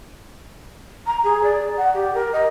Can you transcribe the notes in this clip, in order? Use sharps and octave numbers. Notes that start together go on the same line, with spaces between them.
A#5
G#4
D5
F#5
G4
A#4
D#5